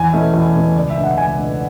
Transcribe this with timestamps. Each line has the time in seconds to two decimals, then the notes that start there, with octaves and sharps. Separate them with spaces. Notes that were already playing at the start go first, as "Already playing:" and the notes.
Already playing: E2 G#5
0.13 B2 A3 C#4 E4
0.34 E2
0.54 B2 A3 C#4 E4
0.76 C#2 D5
0.90 E5
0.97 B2 A3 D4
1.04 F#5
1.18 C#2 G#5
1.38 B2 A3 D4